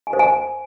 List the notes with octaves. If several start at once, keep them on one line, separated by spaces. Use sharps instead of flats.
G#5
C5
G#5